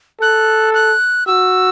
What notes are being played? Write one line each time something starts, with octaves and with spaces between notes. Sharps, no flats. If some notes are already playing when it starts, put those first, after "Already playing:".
A4 F#6
F#6
F#4 E6